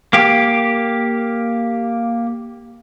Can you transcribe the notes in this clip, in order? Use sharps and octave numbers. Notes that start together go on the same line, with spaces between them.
A#3 G4